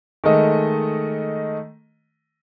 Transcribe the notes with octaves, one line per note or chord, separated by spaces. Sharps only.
D#3 G#3 A3 D#5